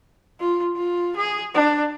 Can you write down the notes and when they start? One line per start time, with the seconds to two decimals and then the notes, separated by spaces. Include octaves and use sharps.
0.40 F4
0.76 F4
1.16 G#4
1.54 D4